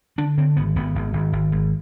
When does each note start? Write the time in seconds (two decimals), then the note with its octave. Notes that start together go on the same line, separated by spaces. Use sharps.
0.18 D3 D4
0.37 D3 C4
0.57 G#1 B3
0.76 G#1 B3
0.95 G#1
1.13 G#1
1.33 G#1
1.52 G#1